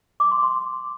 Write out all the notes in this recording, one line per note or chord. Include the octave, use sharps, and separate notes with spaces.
D6
C6
C6